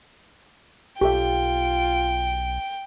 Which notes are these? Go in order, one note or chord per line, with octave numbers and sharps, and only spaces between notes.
B1 F4 G4 A4 E5 G5